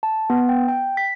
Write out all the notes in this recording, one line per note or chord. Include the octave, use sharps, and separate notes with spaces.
A5
B3
G5
G5
B6